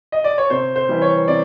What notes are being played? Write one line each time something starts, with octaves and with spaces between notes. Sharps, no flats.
D#5
D5
C#5
C3 C5
C5
E3 G3
C#5
C3 D5